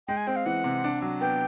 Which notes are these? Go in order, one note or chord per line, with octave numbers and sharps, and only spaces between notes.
G#3 G5
G#5
C4 G5
F5
E3 F#5
C3
D4
F#3
B3 G5